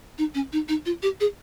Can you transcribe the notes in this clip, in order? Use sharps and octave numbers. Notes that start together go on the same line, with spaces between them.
D#4
C#4
D#4
D#4
F4
G4
G#4